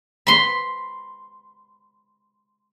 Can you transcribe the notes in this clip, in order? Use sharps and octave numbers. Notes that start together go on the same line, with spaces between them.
B5 C6